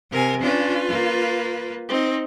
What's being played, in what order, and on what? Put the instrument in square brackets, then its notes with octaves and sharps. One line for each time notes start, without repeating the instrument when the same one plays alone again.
[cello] C3 [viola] A#4 G#5
[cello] C#4 D4 [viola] F4 B4
[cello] A#3
[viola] C4 D#4